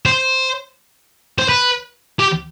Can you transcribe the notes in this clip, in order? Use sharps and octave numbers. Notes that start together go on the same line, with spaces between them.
C5
C5
B4
G4